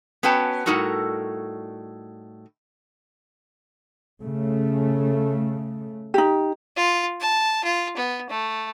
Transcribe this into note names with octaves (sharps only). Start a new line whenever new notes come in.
B3 C#4 F#4 B4 G5 A5
A2 G3 D#4 F#4 A4 A#4
C#3 A3
D#4 G4
F4
A5
F4
B3
A3